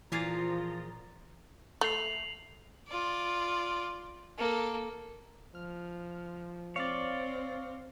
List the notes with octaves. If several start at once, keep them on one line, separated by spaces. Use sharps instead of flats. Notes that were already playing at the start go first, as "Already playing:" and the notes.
A#2 E3 F3 F4 G#4 F5 A#5 A6
A3 C7 F7 F#7
F4 D5
A#3 A4
F3 F6
C4 C#5 D5 F5